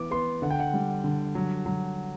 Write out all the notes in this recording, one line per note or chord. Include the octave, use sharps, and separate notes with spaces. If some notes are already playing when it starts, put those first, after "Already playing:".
Already playing: E3 B3 D6
B3 C6
D3 F#5
G5
F#5
G3
D3
F#3
F#3